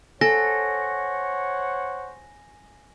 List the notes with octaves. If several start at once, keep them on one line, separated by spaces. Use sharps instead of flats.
A4 C5 C#5 F#5 G#5 A#6